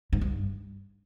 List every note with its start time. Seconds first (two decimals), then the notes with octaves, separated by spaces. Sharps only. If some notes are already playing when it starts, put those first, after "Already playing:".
0.13 G#2
0.21 G2